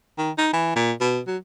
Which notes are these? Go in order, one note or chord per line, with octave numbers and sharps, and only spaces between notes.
D#3
D#4
E3
A#2
B2
F#3